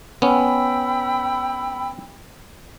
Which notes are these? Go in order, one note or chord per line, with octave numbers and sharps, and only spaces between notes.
B3 C#4 G5 B5 E6